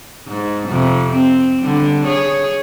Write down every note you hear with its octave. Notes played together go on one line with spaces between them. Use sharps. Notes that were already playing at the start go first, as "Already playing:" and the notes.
G#2
F2 C3
C4
D3 G3
G#4 C#5